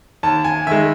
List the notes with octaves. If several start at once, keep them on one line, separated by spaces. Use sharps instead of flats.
D#2 A5
G#5
D#3 G#3 E5